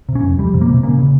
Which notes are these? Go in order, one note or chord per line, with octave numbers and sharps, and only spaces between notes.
C3
C#4
F2
F2 G3
C3
A#3
C3
C#3 A#3
C#3